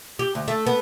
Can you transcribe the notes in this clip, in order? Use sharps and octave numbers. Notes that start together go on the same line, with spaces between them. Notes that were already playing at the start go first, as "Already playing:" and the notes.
G4
D2
A3
B3